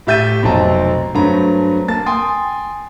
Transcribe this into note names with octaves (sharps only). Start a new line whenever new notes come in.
A2 G4 E5 G6 A6 D#7
F1 B1 C4 F#4 A5 A#5
G2 F#3 A3 C4 A#5 B5
A#3 A5 A6
G5 G#5 C6 D#6